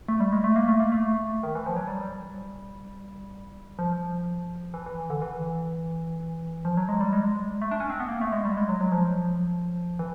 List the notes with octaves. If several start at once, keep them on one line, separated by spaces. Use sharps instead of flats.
A3
G3
G#3
A3
A#3
A3
A#3
A3
D#3
E3
F3
F#3
G3
F3
E3
E3
D3
E3
F3
F#3
G#3
G3
G#3
A3
D4
C#4
C4
B3
A#3
A3
G#3
G3
G#3
F#3
F#3
F3
E3